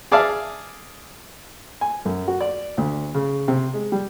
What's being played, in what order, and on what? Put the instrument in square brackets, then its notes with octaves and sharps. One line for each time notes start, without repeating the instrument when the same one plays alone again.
[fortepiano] G#4 D5 E5 F5 A5
G#5
F#2
F#4
D5
D2
C#3
C3
G#3
G3